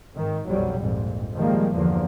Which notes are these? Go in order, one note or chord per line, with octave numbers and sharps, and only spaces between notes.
G#1 D#3
B1 F2 F#3 G3
A#1 F2 G#2
D#3 F3 G3 G#3 A#3
E2 G2 D3 F3 A#3